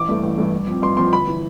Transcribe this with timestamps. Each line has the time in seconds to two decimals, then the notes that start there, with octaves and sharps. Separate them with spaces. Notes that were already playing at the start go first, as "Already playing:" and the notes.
Already playing: A1 D6
0.09 G2 E3 A3
0.23 A1
0.38 G2 E3 A3
0.52 G2
0.67 F3 C4
0.82 G2 C6
0.97 F3 C4 C6
1.13 G1 B5
1.27 E3